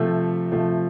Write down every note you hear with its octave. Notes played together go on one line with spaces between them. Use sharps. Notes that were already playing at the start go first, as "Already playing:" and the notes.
Already playing: C3 F3 A3 A4
C3 F3 A3